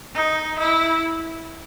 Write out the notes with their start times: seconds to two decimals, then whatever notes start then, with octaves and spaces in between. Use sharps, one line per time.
0.15 D#4
0.59 E4